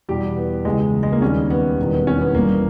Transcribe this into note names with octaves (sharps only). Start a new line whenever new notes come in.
E2 B2 G3 G4
B3
C#2 C#3 E3 G#3
G#3
A#3
D#2 D#3 G3 C#4
B3
E1 E2 D#3 G3
B3
C#4
B3
G1 G2 E3 A#3